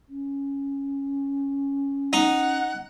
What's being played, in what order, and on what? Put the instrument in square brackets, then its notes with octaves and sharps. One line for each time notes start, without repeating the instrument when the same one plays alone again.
[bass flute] C#4
[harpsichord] D#4 [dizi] F#5